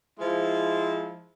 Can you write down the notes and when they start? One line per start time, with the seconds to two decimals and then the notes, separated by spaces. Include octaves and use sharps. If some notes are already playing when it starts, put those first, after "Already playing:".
0.19 F3 G#3 E4